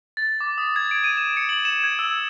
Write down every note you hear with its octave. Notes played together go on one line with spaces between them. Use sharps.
A6
D6
D#6
G#6
D7
D#7
E7
C#7
F#7
E7
G#6
E6